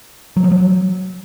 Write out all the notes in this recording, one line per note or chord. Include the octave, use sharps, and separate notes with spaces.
F#3
F3
F#3